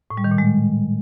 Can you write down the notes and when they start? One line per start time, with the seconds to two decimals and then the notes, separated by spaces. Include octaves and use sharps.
0.10 A2
0.17 G3
0.24 D#3
0.31 A#2
0.38 G#3